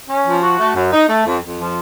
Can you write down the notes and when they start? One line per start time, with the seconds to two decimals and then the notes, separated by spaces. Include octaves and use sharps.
0.09 C#4
0.26 F3
0.42 F#4
0.59 A3
0.75 F#2
0.92 D#4
1.08 A3
1.26 F2
1.42 F2
1.58 F3